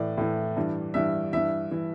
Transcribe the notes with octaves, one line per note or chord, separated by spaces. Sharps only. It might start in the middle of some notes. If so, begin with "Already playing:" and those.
Already playing: A2 E3 D5
A2 E3
G2 E3
G2 E3 E5
G2 E3 E5
E3